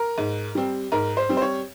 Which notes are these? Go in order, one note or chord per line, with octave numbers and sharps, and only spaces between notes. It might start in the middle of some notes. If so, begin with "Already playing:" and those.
Already playing: A#4
G#2
G3 C4
G#2 A#4
C5
G3 C4
C5
C#5